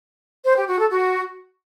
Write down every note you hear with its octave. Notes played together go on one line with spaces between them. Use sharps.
C5
G4
F#4
A4
F#4